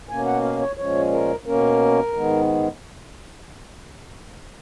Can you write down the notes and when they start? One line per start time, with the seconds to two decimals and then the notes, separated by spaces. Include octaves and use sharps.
0.09 B2 A#3 C#4 G#5
0.26 F#5
0.43 F5
0.60 C#5
0.77 A#2 F3 G#3 C#4 C#5
1.12 A#4
1.45 B2 A#3 C#4 A#4
2.13 G#2 D#3 G#3 B3